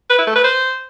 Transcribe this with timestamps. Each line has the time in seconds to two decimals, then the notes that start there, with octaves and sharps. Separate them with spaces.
0.10 B4
0.18 E4
0.27 A3
0.35 B4
0.44 C5